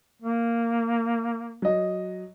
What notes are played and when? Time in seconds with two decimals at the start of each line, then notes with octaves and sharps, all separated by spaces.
0.22 A#3
1.62 F#3 D#5